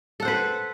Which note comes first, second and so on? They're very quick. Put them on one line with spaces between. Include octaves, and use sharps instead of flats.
A4 F#5 C5 B4